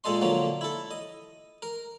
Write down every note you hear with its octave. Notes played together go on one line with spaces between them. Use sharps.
A#2 G#3 A4 D#5 C6
D3 F3 F#3 A#3
E4 A4
D#5
A#4